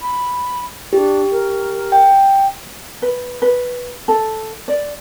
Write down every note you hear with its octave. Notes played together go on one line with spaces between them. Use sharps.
B5
D4 G4
A#4
G5
B4
B4
A4
D5